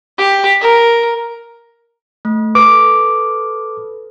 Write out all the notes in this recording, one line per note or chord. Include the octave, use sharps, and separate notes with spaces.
G4
A#4
A3
A4 B4 D6